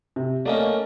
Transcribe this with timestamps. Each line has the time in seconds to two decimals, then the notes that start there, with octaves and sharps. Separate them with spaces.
0.16 C3
0.46 A3 A#3 C#4 D5 D#5